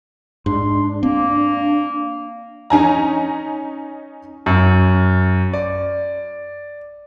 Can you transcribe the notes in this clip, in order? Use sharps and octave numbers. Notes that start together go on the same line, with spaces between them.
G#2 D4 C6
A#3 C4
C#4 D#4 G#5 A#5
F#2
D5